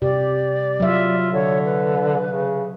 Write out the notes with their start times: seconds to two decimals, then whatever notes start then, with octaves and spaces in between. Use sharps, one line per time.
0.02 C3 G4 D5
0.80 F#3 F4 E5
1.33 D3 C#5
1.65 B4
2.31 C#3